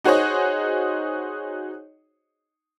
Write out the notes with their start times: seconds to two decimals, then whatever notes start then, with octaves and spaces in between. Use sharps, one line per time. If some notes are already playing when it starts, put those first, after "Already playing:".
0.04 D#4 F#4 G#4 C5 C#5 D#5